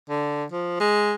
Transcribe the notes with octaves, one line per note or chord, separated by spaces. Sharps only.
D3
F3
G#3